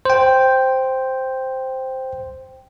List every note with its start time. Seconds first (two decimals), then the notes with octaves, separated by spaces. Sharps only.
0.05 C5 G5